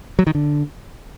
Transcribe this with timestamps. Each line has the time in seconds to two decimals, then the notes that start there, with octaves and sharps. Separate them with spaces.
0.19 F#3
0.27 D#3
0.35 D3